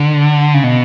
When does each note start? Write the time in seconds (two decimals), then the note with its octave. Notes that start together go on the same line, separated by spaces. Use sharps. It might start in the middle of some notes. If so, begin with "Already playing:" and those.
Already playing: D3
0.54 C#3
0.64 B2